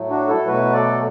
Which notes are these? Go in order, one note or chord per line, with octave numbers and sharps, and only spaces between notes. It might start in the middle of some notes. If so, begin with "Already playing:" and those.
Already playing: A2 F#3 A3
D4 F#4
E4 A4
B2 F#3 A3 F#4 B4
A4 D5